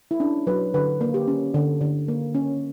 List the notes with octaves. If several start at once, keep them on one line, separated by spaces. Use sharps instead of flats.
E4
C#4 D4
F#3 B4
D3 B4
A#3
G4
C#4
D3
D3
A#3
C#4